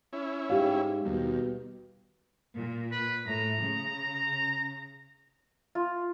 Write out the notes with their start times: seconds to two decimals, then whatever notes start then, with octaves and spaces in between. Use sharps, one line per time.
0.13 C#4 E4
0.50 G#2 G4 F5
1.05 D#2 B2 G3
2.55 A#2
2.92 B4
3.27 A2 A#5
3.60 C#3
5.75 F4